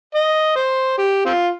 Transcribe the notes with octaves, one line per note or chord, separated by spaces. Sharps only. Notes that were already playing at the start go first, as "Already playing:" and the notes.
D#5
C5
G4
C4 F4